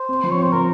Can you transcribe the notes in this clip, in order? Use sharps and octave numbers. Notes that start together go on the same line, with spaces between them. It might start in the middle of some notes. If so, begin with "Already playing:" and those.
Already playing: C5
C4
F3
C#5
C4 C5
F3 A#4